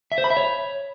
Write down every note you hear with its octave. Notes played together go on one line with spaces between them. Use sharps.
E5
C5
B5
E5
C#5